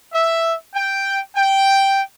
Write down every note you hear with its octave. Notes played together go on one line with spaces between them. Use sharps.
E5
G5
G5